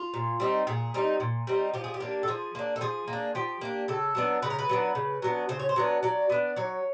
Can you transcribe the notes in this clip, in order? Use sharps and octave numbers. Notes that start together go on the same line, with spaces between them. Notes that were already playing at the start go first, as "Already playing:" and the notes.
Already playing: F4
A#2
G3 C4 D#4
A#2 G#4
G3 C4 D#4
A#2
G3 C4 D#4
F3 G4
G#4
G4
A#3 D4
A4
F3 G#4
A#3 D4
A4
F3 G#4
A#3
D4
F3 G4
A#3 D4
C#3 A4
F#3 B3 D4
C#3 B4
A#4
B4
F#3 B3 D4
C#3
F#3 B3 D4
C#3 C5
C#5
C5
F#3 B3 D4
F#3 D5
B3 D4
F#3 C#5